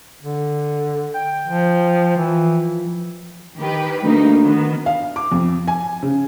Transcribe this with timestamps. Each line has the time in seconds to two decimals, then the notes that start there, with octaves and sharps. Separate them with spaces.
0.22 D3
1.14 G5
1.48 F3
2.17 E3 F3
3.58 D#3 G4 B4
4.04 D2 A#3 D#4
4.42 D#3 B3
4.86 F5
5.16 D6
5.32 F2
5.68 G#5
6.03 C#3